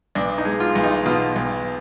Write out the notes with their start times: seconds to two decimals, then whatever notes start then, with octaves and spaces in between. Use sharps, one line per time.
0.15 B1 D4
0.38 D#4
0.45 G#3
0.60 F4
0.75 B1
0.83 D#4
1.06 B2 F4
1.36 B1